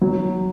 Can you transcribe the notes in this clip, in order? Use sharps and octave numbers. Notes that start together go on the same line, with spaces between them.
F#3